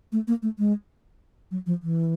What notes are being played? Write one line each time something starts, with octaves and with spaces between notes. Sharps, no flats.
A3
A#3
A3
G#3
F#3
F3
E3